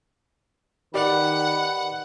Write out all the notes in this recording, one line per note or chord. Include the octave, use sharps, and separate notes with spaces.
D#3 G4 B4 D5 F#5